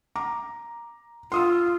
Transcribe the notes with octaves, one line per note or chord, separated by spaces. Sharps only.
A#5 D6
F4 C6 D#6 E6